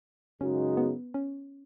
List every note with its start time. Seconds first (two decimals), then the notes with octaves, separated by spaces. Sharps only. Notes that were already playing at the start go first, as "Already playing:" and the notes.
0.41 F#2 C#3 G#3 C#4 D#4 F#4
0.77 B3
1.14 C#4